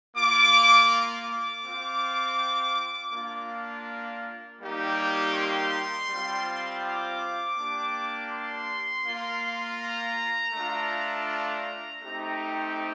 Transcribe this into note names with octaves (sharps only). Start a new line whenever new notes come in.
A#3 F4 D6
D6
C4 F4
A#3 D4 F4
G3 A#3 D#4 G4
C6
G3 C4 F4
D6
A#3 D4 G4
C6
A#3 F4
A#5
A3 D4 F4
A#5
A3 C4 D#4 G4